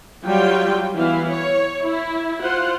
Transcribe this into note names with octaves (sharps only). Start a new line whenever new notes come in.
F#3 G3 F4 G5
E3 B3 E4 F5
C#5
E4
F4 C5 F#5